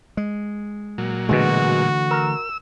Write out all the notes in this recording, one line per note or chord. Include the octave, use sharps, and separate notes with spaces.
G#3
A#2 F#3
B2 D3 E3 G#3 A3 F#4
A#4 E6